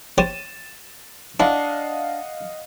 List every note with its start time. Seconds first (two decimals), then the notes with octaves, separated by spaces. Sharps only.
0.18 G4 C5 C#5 A6 D#7 E7
1.40 D4 E4 D#5 F5 F#5